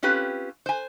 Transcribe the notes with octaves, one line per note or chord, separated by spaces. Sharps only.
C4 C#4 F4 G4 B4
C5 G#5